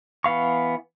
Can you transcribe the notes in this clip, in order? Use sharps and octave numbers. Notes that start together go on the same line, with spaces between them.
E3 B3 F5 C#6